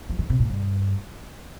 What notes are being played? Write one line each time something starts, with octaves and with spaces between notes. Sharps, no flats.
F3
D#3
C3
A#2
G2